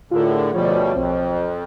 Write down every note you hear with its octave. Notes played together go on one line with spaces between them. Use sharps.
A2 D3 F4 G#4 A#4
D2 B2 F3 G3 C#5
B1 F2 C4